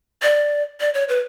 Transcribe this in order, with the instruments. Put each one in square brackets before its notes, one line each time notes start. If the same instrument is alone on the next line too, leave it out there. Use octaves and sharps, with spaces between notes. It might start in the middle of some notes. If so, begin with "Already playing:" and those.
[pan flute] D5
D5
C#5
B4